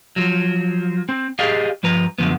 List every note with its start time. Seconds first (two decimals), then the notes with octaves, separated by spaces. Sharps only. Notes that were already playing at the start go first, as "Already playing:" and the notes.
0.16 F3 F#3
1.09 C4
1.39 G4 G#4 D5 D#5 F5
1.83 G2 F3 B4 A#5
2.18 F#2 D3 F3 B3